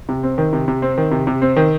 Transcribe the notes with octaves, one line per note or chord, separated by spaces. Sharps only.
C3
C4
D#3
C3
C3
C4
D#3
C3
C3
C4
D#3